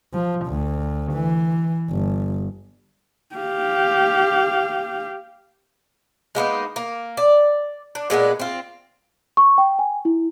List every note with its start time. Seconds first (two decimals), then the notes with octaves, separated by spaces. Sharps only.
0.13 F3
0.46 D2
1.13 E3
1.90 G1
3.36 G4 F5
6.35 G#3 A#3 B3 D#4
6.76 A#3
7.17 D5
7.95 D4
8.10 A#2 G#3 B3 D4
8.40 C4 F4
9.37 C#6
9.58 G5
9.79 G#5
10.05 E4